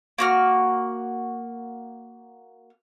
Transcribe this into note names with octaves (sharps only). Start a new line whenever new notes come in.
A#3 F#4 F6